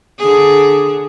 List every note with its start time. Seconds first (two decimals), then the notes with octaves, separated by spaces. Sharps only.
0.19 D3 G#4